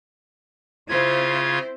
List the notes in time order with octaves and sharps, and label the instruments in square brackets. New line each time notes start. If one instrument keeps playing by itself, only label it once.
[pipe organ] C#3 F4 G#6 [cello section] C4 E4 C5